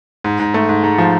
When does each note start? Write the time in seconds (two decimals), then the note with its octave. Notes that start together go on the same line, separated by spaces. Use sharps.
0.24 G#2
0.40 G#2
0.54 A3
0.69 G#2
0.84 G#2
0.98 F3